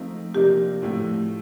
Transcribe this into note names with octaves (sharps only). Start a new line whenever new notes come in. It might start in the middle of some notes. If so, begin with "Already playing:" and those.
Already playing: F3 A3 C4 D#4
C3 F3 A#3 D4 G4
A2 F3 A3 C4